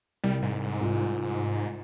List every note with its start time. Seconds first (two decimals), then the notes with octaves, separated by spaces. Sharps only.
0.24 C2 G3
0.42 G#2
0.81 C2 F4